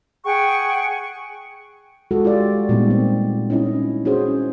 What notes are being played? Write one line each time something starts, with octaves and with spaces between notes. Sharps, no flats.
G#4 F#5 G5 C#6
G#3 F#4 A4
F4 G4 D5
A#2 G3 G#3 B3 D#4
C4
C#4 D#4 E4 D#5
C#4 F#4 G#4 C5